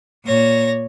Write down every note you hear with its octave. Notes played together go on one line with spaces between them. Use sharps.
A#2 C#5 A#6